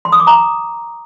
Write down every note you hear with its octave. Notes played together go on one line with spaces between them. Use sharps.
C6
D#6
D6
A#5